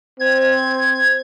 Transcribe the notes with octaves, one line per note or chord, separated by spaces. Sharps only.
C4 G#6